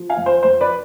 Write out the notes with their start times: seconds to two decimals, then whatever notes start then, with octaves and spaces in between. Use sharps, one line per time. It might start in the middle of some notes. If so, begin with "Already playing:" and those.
Already playing: F3
0.09 F5 G#5
0.17 F2
0.26 C5
0.43 F2 C5
0.61 B4 D5